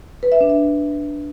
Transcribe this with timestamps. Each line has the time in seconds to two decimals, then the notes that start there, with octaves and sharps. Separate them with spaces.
0.23 B4
0.32 E5
0.41 D4
0.50 E5